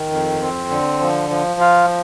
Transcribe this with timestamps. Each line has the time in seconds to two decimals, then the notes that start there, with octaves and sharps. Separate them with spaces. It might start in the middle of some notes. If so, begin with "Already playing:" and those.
Already playing: D#3
0.12 F2
0.41 C4
0.70 D3
1.01 F3
1.30 F3
1.60 F4